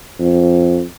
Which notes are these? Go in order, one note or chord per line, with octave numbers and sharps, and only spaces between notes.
F2